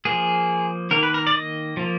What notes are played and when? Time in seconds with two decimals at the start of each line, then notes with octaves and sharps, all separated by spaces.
0.05 F3 A#3 G#4
0.91 D#3 A#3 A#4
1.03 B4
1.14 A#4
1.27 D5
1.34 D#5
1.77 F3 A#3